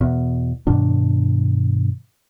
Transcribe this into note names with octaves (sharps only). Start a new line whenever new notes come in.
E2 B2
G2 B2 D#3 D4